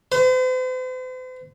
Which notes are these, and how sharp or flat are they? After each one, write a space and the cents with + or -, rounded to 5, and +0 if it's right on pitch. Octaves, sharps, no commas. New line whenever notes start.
C5 -45